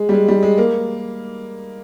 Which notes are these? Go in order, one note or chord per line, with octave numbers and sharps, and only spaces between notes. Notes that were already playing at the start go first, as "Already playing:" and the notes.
Already playing: G#3
G3
G#3
G3
G#3
A#3